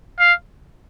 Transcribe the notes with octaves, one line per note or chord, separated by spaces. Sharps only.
F5